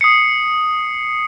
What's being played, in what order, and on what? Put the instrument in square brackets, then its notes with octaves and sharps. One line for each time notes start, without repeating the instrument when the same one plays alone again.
[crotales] D#6 C7 C#7